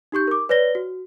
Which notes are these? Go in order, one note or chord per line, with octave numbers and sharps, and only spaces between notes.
D#4 G4 C#6 G6
A#4 D6
B4 C#5 D5 A#6 G7
F#4